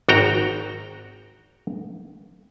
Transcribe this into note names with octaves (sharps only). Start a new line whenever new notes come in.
G#1 F#4 G5 A#5